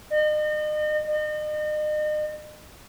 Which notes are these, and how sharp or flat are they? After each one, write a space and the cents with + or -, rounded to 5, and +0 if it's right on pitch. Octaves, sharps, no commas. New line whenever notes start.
D#5 -40
D#5 -40